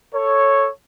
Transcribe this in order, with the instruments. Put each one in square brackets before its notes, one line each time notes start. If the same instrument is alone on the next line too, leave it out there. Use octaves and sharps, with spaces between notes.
[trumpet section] A4 C#5